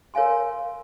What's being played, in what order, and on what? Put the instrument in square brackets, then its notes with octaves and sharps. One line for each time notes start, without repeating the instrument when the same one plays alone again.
[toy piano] A#4 C#5 F5 G#5 C6